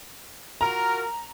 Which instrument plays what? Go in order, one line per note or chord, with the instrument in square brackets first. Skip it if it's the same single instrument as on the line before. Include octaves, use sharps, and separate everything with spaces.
[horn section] F4 F#4 A#4 [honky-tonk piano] A#5